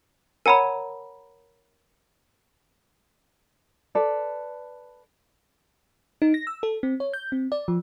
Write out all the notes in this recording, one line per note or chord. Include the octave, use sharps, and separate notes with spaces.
A#4 C#5 F#5 G#5 A#5 B5
A4 B4 D5
D#4
A#6
E6
A4
C4
C#5
G6
C4
D5
F3